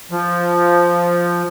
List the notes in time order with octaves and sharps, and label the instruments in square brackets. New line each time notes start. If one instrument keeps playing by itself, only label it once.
[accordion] F3